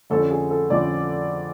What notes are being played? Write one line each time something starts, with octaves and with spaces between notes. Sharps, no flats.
F2 D3 F3 A3 C#4 A4
G#4
A4
F2 D3 F3 A3 C#4 D5